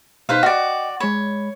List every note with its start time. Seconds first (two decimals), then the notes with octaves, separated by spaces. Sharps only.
0.29 B2 D#4 B4 C5 F5
0.43 F#4 D5 D#5 G5
1.00 G#3 C#5 B5